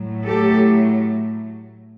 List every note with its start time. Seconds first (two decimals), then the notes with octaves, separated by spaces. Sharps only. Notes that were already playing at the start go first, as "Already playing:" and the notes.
Already playing: A2 F#3 A3
0.25 G4 A4